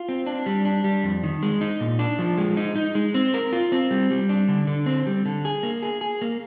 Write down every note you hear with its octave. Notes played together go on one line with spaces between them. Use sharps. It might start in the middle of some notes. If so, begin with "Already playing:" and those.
Already playing: F4
C4
D4
G3
D4
G3
F2
D#3
G#3
D#4
A#2
D4
F3
G#3
D#4
D#4
G#3
C4
A#4
F4
C4
G3
G3
D4
D3
D3
C4
G3
D3
G#4
A#3
G#4
G#4
A#3